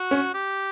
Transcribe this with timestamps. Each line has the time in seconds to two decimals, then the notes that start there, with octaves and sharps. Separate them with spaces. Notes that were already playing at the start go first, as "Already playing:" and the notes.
Already playing: F#4
0.11 C#4
0.34 G4